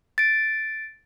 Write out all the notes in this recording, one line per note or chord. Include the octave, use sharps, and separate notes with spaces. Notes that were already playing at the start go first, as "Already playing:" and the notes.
A6 D7